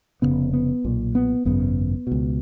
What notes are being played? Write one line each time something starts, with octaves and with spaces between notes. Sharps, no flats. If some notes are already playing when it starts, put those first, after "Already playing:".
F1 D#2 C#3 B3
B3
B1 A#2
B3
G#1 F#2 C#3 B3
C#2 B2